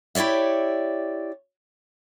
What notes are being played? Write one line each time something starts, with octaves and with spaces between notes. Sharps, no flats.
E4 G4 C#5 D5 E5